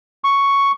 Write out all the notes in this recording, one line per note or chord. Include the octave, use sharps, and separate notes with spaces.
C#6